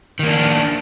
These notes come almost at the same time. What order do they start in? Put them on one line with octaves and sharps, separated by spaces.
D#3 A#3 D4